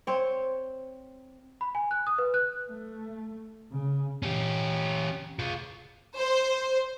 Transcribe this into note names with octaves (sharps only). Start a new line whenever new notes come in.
C4 C#5
B5
G#5
F#6
D#6
B4
F#6
A3
C#3
C#4 G4
F4 G#4
C5